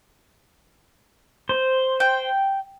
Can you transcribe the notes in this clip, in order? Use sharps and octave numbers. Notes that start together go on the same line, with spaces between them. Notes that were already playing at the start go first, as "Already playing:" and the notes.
C5
G5